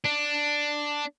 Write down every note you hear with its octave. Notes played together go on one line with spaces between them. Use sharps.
D4